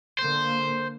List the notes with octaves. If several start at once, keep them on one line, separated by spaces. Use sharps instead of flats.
D3 A#3 C5